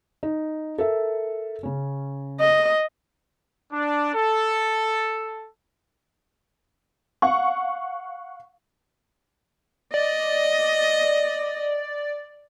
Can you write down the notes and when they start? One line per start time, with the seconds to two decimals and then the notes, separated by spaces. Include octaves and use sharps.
0.23 D#4
0.78 A4 A#4 E5
1.63 C#3 C#4
2.40 D#5
3.72 D4
4.14 A4
7.22 F5 F#5 C#6
9.94 D5 D#5